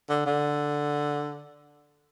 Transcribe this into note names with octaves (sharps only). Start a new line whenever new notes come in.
D3
D3